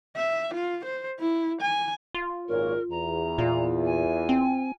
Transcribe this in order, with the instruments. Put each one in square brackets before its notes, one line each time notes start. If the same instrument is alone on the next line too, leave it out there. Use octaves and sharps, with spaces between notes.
[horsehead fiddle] E5
F4
C5
E4
G#5
[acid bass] F4
[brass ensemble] G#1 A#2 C#5 [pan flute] A#4
[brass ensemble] E2 [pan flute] A#5
[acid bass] A#2 [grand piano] F4
[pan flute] G#5
[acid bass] C4